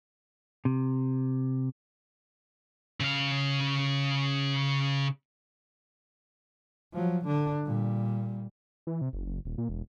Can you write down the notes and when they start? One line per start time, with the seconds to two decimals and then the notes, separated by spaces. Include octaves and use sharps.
0.65 C3
3.00 C#3 F5
6.93 F3 F#3
7.25 D3 D4
7.64 A#2 G3
8.87 E3
9.01 C3
9.13 F#1
9.26 F#1
9.45 D#1
9.58 A#2
9.69 E1